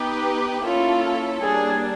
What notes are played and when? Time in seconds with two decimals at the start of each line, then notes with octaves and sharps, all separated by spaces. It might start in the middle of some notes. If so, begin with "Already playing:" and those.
Already playing: B3 D#4 G4 B4
0.63 A#3 C#4 E4 F4 A4 C#5
1.42 G3 A#3 D4 G#4